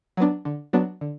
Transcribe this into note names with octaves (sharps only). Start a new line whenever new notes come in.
F#3 B3 D4
D3
F#3 B3 D4
D3